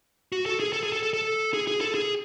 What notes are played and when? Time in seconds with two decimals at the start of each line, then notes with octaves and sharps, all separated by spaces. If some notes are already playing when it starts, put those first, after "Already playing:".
0.32 F#4
0.46 A4
0.60 G#4
0.73 A4
0.83 G#4
0.93 A4
1.03 A4
1.14 A4
1.54 G#4
1.68 G#4
1.81 A4
1.95 G#4